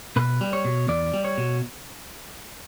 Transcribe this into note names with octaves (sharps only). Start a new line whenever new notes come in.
B2 B4
G3
C#5
B2
E2 D5
G3
C#5
B2